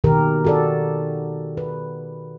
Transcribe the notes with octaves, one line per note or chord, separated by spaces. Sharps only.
B2 D#3 G4 A#4
F#4 A4 D5
B4